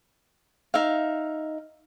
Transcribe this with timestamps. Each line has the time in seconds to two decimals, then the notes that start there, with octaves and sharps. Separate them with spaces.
0.74 D#4 E5 F5